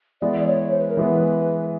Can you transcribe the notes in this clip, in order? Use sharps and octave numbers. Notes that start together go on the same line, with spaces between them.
E3 G#3 B3 D5
D5
C#5
C5
B4
A#4
E3 G#3 B3 B4